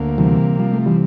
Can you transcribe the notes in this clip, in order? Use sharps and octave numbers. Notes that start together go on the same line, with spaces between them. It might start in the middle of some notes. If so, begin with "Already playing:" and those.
Already playing: D2 A#3
C3 E3 G3
F3 G3
A3
E3 G3